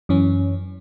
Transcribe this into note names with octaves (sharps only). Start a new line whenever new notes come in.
F#2 E3 C#4